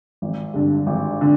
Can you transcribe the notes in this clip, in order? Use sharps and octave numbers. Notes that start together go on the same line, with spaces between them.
G#1
G2 D3
G#1
D3